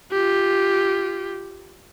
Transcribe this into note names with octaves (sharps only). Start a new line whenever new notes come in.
F4 G4